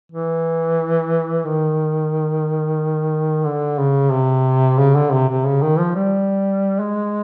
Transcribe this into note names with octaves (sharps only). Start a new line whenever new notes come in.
E3
D#3
D3
C#3
C3
C#3
D3
C3
C3
C#3
D#3
F3
G3
G#3